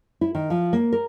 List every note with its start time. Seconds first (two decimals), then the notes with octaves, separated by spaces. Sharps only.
0.21 E4
0.35 D#3
0.50 F3
0.73 A#3
0.92 A#4